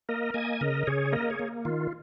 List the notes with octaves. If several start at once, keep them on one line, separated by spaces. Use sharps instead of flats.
A#3 A#4 D#5
A#3 D#5 G#5
C#3 A#4 D#5
C#3 G#4 C#5
A#3 A#4 D#5
G#4 C#5
A#3
D#3 F4